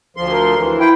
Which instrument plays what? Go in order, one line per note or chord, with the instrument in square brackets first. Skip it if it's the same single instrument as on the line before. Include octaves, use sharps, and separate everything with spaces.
[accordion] D2 F3 C6
[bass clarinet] A#4
[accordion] E3
[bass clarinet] E4 [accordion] G5